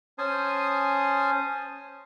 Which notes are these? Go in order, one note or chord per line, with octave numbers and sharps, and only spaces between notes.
C#4 C5 G#5 A5 D#6